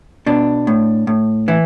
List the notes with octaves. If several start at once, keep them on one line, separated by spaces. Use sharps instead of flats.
B2 D4
A2
A2
E3 E4